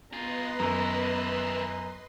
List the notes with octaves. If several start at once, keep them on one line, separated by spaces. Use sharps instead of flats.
B3 F4 G#4 B4 D#5 A#5 C6
F#2 D#3 E4